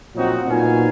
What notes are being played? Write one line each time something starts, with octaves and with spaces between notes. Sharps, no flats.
A#2 F3 F#3 C4 D#4 F#4
A#2 F#3 B3 D#4 F5 G#5